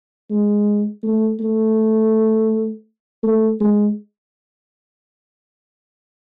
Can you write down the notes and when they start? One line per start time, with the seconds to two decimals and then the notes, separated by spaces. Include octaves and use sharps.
0.30 G#3
1.03 A3
1.40 A3
3.23 A3
3.60 G#3